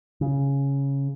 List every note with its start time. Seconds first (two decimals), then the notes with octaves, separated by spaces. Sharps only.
0.21 C#3